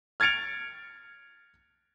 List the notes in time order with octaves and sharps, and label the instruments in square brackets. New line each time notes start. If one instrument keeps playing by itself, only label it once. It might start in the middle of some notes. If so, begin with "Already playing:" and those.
[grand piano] F6 G#6 A6 C#7 D7 F7